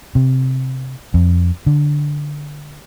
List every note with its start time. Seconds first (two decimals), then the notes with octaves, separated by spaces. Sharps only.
0.15 C3
1.14 F2
1.66 D3